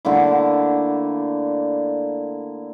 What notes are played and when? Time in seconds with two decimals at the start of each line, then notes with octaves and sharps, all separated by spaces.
0.05 D3 A3 A#3 E4